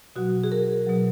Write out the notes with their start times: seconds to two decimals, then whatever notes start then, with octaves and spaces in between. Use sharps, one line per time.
0.16 B2 F#3 F#4
0.44 G#4
0.52 A#4
0.86 B2 F#3